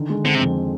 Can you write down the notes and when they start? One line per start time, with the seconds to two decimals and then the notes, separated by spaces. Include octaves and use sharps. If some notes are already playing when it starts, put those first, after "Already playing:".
Already playing: D3 D#3
0.10 G#3
0.25 D3 C4
0.35 C3
0.40 F2